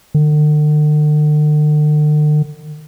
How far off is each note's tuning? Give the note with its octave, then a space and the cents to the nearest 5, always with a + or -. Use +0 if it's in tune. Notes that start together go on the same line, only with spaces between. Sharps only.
D3 +45